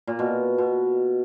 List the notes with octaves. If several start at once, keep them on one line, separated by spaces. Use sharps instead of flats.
A#2
B2
B2